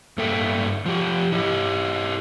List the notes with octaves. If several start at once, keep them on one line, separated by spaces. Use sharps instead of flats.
G2 A#3 A4 E5 G5
F3 G4
E4 G4 D#5